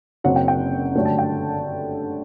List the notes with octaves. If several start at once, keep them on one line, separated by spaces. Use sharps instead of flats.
F#1 F#2 F#3 C4 F#5
G5
G5
G2 D3 F#3 A3
A5
G5